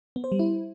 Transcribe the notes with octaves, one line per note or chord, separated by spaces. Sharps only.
B3
C5
G3
E4